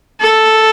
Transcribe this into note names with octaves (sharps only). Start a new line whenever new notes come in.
A4